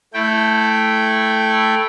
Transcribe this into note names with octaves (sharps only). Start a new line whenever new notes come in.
A3 E4 G5